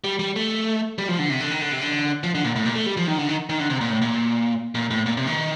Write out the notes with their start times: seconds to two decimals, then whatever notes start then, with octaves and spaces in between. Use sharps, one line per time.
0.04 G3
0.19 G3
0.36 A3
0.98 G3
1.08 F3
1.19 D3
1.30 C3
1.40 D3
1.51 D#3
1.61 D3
1.72 C3
1.81 D3
2.23 F3
2.35 D3
2.44 A#2
2.56 A2
2.66 A#2
2.76 A3
2.86 G3
2.97 F3
3.07 D#3
3.18 D3
3.29 D#3
3.49 D#3
3.60 D3
3.70 C3
3.81 A#2
3.91 A2
4.02 A#2
4.75 A#2
4.91 A2
5.06 A#2
5.17 C3
5.27 D#3